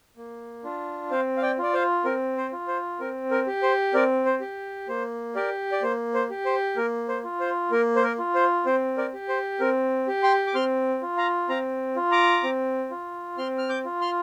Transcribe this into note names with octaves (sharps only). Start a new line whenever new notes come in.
A#3
D4 F4
C4 C5 F5
F5
D5 G5
F4 D5
C5 F5
C4 A#4
C5
F4
C5
C4 A#4
A#4
G4
C5
C4 A#4 D5
C5
G4
A#3 C5
G4 A#4 D5
D5
A#3 C5
C5
G4
C5
A#3 A#4
C5
F4
C5
A#3 A#4
C5
A#4
F4
C5
C4 C5
A#4 D5
G4
C5
C4 A#4
G4
G5 C6
D6
C4 C6 F6
F4
F5 A#5
C4 F5 A#5
F4
A#5 D6
C4
F4
C4 C6 F6
F6
D6 G6
F4
C6 F6